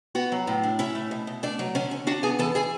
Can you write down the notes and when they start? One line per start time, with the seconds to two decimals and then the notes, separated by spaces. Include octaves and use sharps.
0.15 B3 F#4 F#5
0.32 F#3
0.47 A2
0.63 D4
0.79 C#4 E4 E5
0.95 A3
1.11 B2
1.27 B2
1.43 A3 D4 D5
1.59 F#3
1.75 D3 C#4 C#5
1.91 C#4
2.07 D4 F#4 F#5
2.23 B3 G#4 G#5
2.39 E3 A4 A5
2.55 E3 G#4 G#5